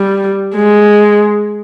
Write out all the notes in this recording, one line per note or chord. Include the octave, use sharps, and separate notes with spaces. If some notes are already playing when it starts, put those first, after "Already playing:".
Already playing: G3
G#3